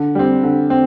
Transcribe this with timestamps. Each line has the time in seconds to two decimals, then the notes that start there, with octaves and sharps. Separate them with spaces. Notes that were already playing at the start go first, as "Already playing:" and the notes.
Already playing: D3
0.15 G3 C4
0.43 D3
0.70 C4